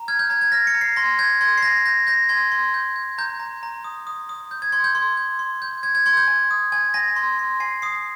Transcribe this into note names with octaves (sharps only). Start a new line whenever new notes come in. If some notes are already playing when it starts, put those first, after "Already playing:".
Already playing: A#5
F6 G#6
G6
A#5 G#6
G#6
F6 A#6
C#7
A#5
C7
C6 A#6
G6 G#6
C6 G#6
C7
G6 A#6
G6 A#6
G6 A#6
C6 G#6
C6
G6
G6
A#5 G6
A#5
A#5
D#6
D#6
D#6
G6
G#6
C6 G#6
G6
C6
G6
C6
G6
G6 G#6
G#6
C6 G#6
G6
G#5
D#6
G#5 G#6
G#5 A#6
C6
C6
G#5 C7
D#6 C7